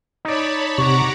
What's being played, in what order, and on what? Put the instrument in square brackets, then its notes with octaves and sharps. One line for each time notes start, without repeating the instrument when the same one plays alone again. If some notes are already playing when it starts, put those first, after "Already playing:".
[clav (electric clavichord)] D#4 D5 [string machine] C#5 A5 B5
[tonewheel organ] C3 [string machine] F#5 A#5 D6 [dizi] C#6